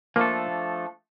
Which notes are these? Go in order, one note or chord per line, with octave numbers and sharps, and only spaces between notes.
F3 A3 A#3 D4 A4